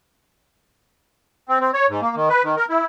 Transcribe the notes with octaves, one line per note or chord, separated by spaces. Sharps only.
C4
C4
C#5
G#2
A#3
D#3
B4
D#3
A#4
E4